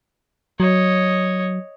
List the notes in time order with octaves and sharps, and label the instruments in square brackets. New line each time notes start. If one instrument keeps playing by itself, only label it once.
[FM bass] F#3 [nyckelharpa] C#5 D#5